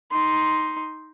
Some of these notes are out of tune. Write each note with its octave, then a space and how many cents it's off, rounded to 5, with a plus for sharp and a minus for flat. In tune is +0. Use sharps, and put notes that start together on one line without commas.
D#4 +10 C6 +0